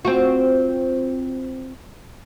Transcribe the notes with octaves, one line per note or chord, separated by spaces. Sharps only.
C4 F4 F#4